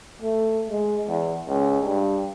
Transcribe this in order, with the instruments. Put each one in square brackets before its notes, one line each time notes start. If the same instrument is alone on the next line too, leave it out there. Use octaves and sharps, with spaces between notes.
[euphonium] A3
G#3
E2
C#2
G2